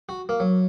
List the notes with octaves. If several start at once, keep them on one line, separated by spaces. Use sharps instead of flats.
F#4
A#3
F#3